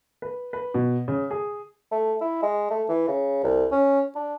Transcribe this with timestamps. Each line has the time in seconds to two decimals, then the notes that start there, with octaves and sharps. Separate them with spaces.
0.22 B4
0.53 B4
0.74 B2
1.08 C#3
1.31 G#4
1.92 A3
2.21 E4
2.43 G#3
2.71 A3
2.89 E3
3.08 C#3
3.44 C2
3.72 C#4
4.16 D4